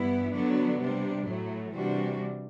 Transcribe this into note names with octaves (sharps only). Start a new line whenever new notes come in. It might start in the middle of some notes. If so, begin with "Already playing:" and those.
Already playing: G2 E3 B3 E4
D3 F#3 B3 D4
C3 G3 D4
A2 F#3 A3
C3 E3 G3 D4 F#4